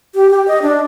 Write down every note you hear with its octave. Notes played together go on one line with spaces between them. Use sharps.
G4
G4
D#5
D4